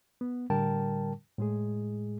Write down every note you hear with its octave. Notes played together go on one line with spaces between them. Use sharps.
B3
A2 D3 G3 A#4 G5 A5
A2 G#3 G#4